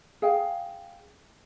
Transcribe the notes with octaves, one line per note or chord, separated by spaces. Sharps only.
G#4 F5 G5